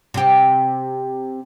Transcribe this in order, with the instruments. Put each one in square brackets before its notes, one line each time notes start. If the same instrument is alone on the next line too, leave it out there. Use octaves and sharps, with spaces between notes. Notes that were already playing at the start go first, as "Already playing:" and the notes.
[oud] C3 G4